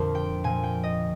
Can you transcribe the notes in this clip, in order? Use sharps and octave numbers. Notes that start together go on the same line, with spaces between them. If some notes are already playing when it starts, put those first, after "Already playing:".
Already playing: F2 A#2 D3 F3 A#4 C5
G5
A#2 F3 G#5
G5
D#5